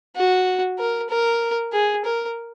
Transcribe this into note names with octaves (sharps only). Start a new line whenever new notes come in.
F#4
A#4
A#4
G#4
A#4